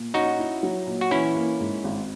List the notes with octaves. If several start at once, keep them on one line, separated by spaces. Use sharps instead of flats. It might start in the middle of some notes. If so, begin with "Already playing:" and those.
Already playing: A#2
C#4 D#4 F#4
E4
F#3
A#2
F#4
E3 C#4 E4
A#3
G#2
G#1